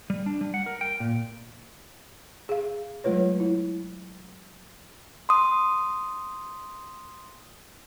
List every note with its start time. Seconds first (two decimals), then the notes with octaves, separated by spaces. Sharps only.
0.10 G3
0.26 D4
0.41 G3
0.54 F#5
0.66 A#4
0.81 G5
1.00 A#2
2.49 G#4 F5
3.04 F#3 G#3 A3 F4 B4 C#5
3.40 E4
5.29 C6 D#6